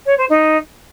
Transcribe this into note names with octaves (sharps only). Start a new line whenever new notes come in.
C#5
C5
D#4